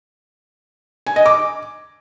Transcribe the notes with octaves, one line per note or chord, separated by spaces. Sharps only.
G#5
D#5
D6